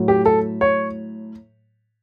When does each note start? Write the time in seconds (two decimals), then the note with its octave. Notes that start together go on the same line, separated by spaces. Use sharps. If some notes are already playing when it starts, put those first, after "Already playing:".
Already playing: A2 F#3
0.08 G4
0.26 A4
0.61 C#5